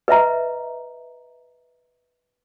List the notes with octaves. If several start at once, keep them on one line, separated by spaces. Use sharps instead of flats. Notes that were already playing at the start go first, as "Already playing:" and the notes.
B4 D#5 E5 A#5